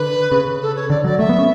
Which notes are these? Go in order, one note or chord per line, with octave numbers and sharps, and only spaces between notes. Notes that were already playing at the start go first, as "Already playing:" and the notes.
Already playing: D3 B4
C#3
A4
C#5
D3 D5
F#3 D5
A3 E5
B3
C#4